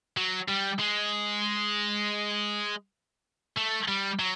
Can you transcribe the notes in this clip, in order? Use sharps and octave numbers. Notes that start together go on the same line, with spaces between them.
F#3
G3
G#3
A3
G3
F#3